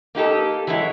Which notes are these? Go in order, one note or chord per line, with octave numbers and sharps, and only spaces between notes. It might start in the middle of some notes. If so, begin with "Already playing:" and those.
A#3 D#4 G4 A4
E3 F#3 G#3 E4